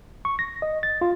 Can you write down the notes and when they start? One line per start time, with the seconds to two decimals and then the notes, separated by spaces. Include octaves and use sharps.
0.25 C#6
0.39 A#6
0.62 D#5
0.83 A6
1.01 F4